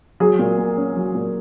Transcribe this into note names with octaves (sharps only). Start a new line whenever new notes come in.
F#3 G#4
A#2
A#3
C#4
F#3
A#2